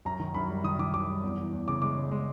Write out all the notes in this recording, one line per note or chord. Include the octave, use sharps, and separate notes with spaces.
F#2 A#5
D#3
F#2 B5
G3
D#3 D#6
D#3 D6
F#2 D6
G3
E2
E3
E2
C#3 D6
G#3 D6
C#3
G#3